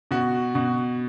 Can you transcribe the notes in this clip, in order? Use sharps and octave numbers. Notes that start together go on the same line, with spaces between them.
B2 F#4
B2